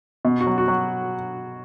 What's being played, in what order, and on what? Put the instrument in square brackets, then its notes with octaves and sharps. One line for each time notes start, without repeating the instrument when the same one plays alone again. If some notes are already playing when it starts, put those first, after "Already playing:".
[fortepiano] B2
F#4
F#3
F#4
F#3